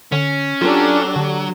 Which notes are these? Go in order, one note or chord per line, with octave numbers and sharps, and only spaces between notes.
D3 C#4
F#3 D4 F4 G4 A4
D3